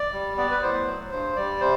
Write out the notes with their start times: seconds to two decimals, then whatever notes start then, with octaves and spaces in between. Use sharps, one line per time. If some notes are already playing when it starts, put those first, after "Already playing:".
Already playing: D5
0.13 G3
0.38 B3 D5
0.51 B4
0.62 A2 C5
0.87 F#3
1.11 G2 C5
1.36 G3 D5
1.60 C3 C5